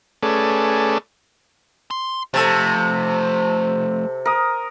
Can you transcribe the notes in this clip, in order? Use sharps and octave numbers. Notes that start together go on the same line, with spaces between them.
A3 C#4 G#4 A4 B4 D5
C6
C3 F3 A3 A4 A5
A#4 D#6